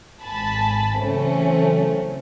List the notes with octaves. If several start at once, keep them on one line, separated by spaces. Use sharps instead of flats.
G#1 G#5 A5 B5
C#3 E3 F#3 A3 C4 C#4